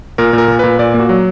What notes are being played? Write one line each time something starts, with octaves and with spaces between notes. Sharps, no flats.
A#2 A#4
A#2
A#4
A#2
A#2 B4
A#2 D5
A#3
F#4
F#3